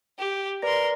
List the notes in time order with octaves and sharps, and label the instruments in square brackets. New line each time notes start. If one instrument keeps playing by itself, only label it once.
[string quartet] G4
[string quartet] A#4 C6 [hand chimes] B4 D5 A#6